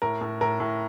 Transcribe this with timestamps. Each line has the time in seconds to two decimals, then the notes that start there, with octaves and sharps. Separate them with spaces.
0.02 A2 A#4
0.21 A2
0.41 A2 A#4
0.60 A2